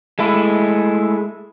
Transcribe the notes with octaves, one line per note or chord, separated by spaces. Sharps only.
G#3 A3 E4